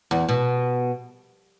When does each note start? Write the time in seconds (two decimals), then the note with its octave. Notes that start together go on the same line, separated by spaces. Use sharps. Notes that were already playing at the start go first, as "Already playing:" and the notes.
0.11 E2
0.29 B2